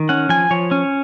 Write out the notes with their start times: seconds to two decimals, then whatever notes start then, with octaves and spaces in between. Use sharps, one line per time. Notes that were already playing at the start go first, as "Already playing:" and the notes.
Already playing: D#3
0.09 C#4 F#5
0.29 F3 G#5
0.50 F3 C#5
0.71 C#4